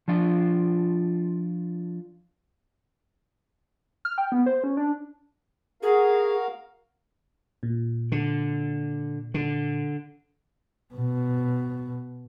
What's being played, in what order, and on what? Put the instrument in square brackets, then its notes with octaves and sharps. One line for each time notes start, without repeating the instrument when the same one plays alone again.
[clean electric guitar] F3 D4 F4
[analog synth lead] F6
G5
B3
C5
C#4
D4
[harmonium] F#4 A#4 F5 [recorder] G#4
[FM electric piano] A#2
[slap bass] D3
D3
[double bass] B2